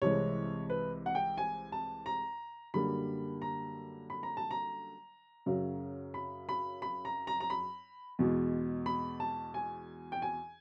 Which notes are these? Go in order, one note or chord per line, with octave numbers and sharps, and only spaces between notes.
C2 C3 E3 G#3 C#5
B4
F#5
G5
G#5
A5
A#5
F#2 D3 G3 A#3 B5
A#5
B5
A#5
A5
A#5
F#2 C#3 F#3
B5
B5
B5
A#5
A#5
A#5
B5
E2 B2 G#3
B5
A5
G#5
G5
G#5